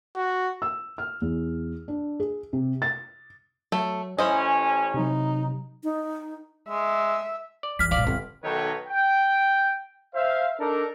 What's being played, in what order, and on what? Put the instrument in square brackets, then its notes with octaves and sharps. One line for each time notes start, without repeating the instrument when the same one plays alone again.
[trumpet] F#4
[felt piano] E6
F6
E2
D4
G#4
C3
A6
[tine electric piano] F#3 [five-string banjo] A3
[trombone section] A1 C#4 [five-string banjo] E4 C5 D#5 [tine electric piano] G#5
[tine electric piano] C3 F#3 [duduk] D#4
[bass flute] D#4
[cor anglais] G#3 [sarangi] E5
[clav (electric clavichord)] D5
[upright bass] E2 [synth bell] F6 B6
[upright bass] G1 A#2 [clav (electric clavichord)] D5 F5
[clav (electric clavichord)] G1 [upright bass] C4
[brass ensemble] B1 D#3 D#4 A4 B4 C#5
G5
C5 E5 F5
D4 D#4 A4 A#4